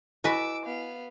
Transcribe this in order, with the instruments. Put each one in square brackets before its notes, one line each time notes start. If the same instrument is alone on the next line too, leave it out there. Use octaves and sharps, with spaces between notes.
[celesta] E4 D#5 G#5 [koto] F#4 B4 [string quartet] D6 E6
[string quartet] B3 F5